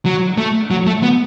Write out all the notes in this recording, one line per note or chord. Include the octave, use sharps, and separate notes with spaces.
F#3
A3
F#3
A3
B3